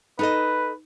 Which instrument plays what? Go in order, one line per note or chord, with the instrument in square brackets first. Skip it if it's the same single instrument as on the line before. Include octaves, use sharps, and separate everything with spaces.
[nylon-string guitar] D#4 A4 D#5 [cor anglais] B4